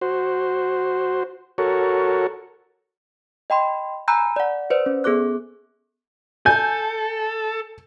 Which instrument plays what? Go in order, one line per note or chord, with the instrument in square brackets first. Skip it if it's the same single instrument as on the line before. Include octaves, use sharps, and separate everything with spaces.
[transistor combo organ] F#4 C5
F#4 A4 A#4 C#5
[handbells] D#5 G5 B5 C6
G#5 A#5 B5 E6 F#6 G6
D5 F#5
B4 C5 D5
C#4
B3 G#4 A4 D6 F#6
[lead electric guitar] A4 [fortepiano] G#5 [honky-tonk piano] G6